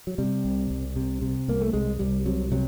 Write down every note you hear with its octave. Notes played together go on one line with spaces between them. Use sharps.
F#3
C3 G3
C2
C2
C3
C3
C2 A#3
A3
C2 G#3
C2 G3
C3 F#3
C3 F#3